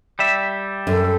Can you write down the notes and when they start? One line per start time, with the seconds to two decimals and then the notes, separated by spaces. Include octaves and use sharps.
0.19 G3 E5
0.87 F#2 A4